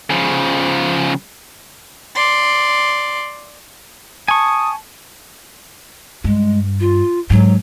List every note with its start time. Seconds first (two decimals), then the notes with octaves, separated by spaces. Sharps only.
0.10 C#3 F3
2.16 D5 C6
4.28 G#5 A5 C#6 D#6
6.24 G2 G#3
6.80 F4
7.30 G#2 F#3